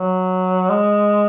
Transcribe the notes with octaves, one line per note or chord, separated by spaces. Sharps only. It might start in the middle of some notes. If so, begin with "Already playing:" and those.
Already playing: F#3
G#3